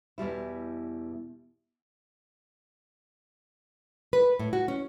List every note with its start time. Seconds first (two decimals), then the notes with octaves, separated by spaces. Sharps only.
0.18 E2 B2 G3 E4
4.13 B4
4.39 A2
4.53 F#4
4.68 C#4